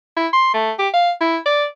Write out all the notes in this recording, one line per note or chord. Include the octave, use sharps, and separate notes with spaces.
E4
C6
A3
G4
F5
E4
D5